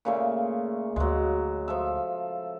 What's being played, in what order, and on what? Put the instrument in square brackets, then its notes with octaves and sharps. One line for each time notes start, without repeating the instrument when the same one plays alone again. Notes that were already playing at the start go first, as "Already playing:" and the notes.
[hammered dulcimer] A#2 C#3 A3
[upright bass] D2 [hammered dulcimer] F#3 G#3
[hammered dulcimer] F3 A4 E5